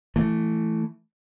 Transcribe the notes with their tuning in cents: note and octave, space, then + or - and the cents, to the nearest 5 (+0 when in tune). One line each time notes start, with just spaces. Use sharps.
E3 +5 A3 +0